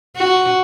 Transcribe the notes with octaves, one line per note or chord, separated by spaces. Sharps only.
F#4